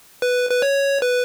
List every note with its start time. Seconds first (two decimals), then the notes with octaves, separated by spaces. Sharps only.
0.22 B4
0.50 B4
0.62 C#5
1.02 B4